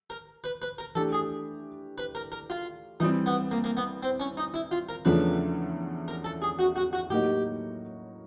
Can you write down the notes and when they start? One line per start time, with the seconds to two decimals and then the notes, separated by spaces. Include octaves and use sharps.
0.10 A#4
0.44 B4
0.62 B4
0.78 A#4
0.95 E3 A3 D4 G4 A4
1.12 G#4
1.98 B4
2.15 A#4
2.32 A#4
2.50 F4
3.00 E3 G3 C4 D#4
3.26 B3
3.51 A#3
3.64 A#3
3.77 B3
4.03 C4
4.20 C#4
4.37 D#4
4.54 E4
4.71 F4
4.89 A#4
5.05 E2 C#3 F3 A3 D4 B4
6.08 A#4
6.24 A4
6.42 G#4
6.59 F#4
6.76 F#4
6.93 F#4
7.10 A2 F#3 A#3 D#4 F#4 G4